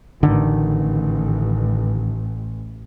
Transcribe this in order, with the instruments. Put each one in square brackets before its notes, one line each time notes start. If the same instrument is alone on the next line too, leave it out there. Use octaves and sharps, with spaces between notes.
[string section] A1 [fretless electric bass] D3 D#3